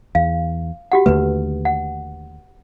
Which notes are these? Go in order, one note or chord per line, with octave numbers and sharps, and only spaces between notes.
E2 F5
F#4 G4 F#5
D#2 D3 A3 B4
F#5